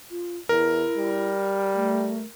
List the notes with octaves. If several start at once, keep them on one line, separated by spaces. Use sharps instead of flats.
F4
E2 E4 A#4
G3
A3